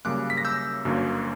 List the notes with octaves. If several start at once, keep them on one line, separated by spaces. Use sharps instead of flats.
F#2 C#3 G3 A#3 D6 F#6
B6
A#6
E6 G6
G1 F#2 D3 F#3 A#3